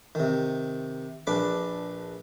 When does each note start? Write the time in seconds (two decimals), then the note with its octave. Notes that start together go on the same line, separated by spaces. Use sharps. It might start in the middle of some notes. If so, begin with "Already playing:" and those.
0.15 C3 D#3
1.27 A#1 D4 B4 D6